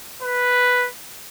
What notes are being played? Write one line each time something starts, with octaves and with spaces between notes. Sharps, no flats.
B4